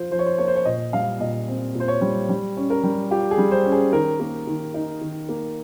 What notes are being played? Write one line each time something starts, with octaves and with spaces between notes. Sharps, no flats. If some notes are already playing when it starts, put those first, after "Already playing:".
Already playing: F3 F4 C5
F3 C5
C#5
C5
A#3 C#5
C5
C#5
A#2 D#5
G3 F5
A#2 D#5
C4
A#2
C5
C#5
G3
G3
C#4
A#4
G3
F4 G4
G#4
G3
C5
C#4
G#4
D#3 A#4
A#3
D#3
D#4
D#3
A#3